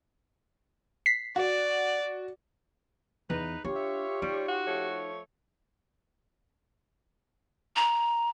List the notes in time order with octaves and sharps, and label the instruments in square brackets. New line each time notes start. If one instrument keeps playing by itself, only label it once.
[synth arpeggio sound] B6 C7
[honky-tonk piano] F#4 [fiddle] D5
[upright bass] E2 [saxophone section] D#4 B4
[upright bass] D4 [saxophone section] F4 C#5 [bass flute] G4
[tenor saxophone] E5
[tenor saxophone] G3 [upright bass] D#4
[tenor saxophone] F#4
[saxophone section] F3 A3 C#5
[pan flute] A#5